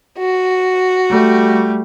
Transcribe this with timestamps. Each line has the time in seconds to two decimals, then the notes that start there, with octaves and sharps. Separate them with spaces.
0.18 F#4
1.10 G3 A3